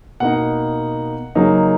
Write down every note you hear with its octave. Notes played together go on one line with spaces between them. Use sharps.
B2 A#3 D#4 F#5
C#3 F#3 A#3 D#4